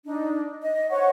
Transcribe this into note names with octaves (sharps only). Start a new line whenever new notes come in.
D4 D#4
D#5
C5 C#5 F#5 C#6